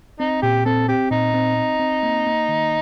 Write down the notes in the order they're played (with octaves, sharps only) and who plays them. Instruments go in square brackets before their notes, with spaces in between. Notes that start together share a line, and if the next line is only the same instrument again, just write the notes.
[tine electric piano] C4 [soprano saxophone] D#4
[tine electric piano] A#2 [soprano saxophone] G4
[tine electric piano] C4 [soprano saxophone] A4
[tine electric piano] C4 [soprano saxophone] G4
[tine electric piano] A#2 [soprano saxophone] D#4
[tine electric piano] C4
C4
C4
A#3
A#3
D#3